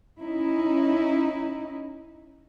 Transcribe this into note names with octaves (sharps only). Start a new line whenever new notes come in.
C#4 D#4 E4